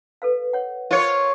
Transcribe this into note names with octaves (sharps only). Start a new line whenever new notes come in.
A4 B4 F5
C#5 F#5
F4 A#4 C5 C#5